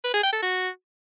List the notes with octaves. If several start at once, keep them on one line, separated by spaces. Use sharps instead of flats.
B4
G#4
G5
A4
F#4